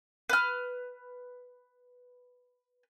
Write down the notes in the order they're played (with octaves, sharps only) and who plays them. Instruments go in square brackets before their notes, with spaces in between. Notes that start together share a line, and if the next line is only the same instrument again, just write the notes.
[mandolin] B4 F6